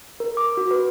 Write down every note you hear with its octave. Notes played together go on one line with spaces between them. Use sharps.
A#4
D6
F#4
B4